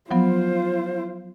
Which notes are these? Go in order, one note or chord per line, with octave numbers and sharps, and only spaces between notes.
F3 F#3 B3 F4 C5